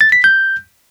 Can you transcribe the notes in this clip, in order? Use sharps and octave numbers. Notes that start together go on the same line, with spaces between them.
A6
B6
G6